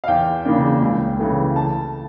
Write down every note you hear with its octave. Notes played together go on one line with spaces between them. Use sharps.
F5
E2 G5
C#3 E3 A#3 D4
C#2
C#3 E3 A3
A5